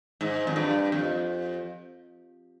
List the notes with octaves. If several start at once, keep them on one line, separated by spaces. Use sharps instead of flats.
G#2
F2
G2
F2